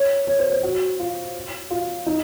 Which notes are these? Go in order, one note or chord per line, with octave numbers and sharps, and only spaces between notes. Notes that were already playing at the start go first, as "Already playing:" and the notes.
Already playing: C#5
C#5
C5
C5
F#4
F4
F4
D#4